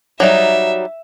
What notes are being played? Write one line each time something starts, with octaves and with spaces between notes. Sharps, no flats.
F#3 G3 D#4 E5